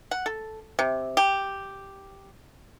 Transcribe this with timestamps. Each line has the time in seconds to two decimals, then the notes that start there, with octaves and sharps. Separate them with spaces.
0.11 F#5
0.26 A4
0.79 C3
1.17 G4